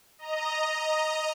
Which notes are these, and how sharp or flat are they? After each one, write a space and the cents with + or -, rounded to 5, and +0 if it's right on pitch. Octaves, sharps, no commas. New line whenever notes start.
D#5 +0 A#5 +0